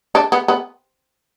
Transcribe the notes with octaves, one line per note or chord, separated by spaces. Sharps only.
D4
B3
B3